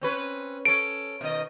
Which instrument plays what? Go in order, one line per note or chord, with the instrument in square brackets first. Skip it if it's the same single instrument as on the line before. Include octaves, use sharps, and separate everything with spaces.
[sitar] C4 C#4 B4
[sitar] C#4 A4 [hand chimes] D7
[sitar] B2 D#3 D#5